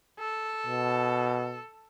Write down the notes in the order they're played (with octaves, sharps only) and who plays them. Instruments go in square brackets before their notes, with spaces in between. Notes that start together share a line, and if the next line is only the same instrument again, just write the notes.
[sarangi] A4
[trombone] B2